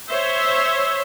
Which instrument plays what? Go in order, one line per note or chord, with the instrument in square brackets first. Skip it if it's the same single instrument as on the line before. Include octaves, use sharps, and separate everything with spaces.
[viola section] C5 C#5 E5